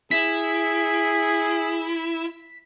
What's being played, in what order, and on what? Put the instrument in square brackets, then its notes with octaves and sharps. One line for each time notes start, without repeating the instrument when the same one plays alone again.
[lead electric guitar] E4 [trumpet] G#4 [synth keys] B6